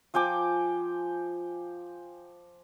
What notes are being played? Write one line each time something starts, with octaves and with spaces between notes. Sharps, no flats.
F3 G5 G#5 D6